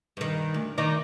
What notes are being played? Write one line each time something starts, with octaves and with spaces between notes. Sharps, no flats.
G2 D#3
D2
D#3 D#4 D5